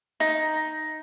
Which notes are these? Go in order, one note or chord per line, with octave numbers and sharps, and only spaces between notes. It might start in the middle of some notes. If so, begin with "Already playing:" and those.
D#4